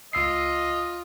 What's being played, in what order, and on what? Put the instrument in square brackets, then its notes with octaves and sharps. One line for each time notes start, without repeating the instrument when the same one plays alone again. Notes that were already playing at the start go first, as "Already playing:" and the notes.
[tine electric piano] C#2 E6 C7 [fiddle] F4 [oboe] D#5